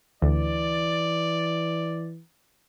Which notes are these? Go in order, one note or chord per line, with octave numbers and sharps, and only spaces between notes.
D2 E3 D5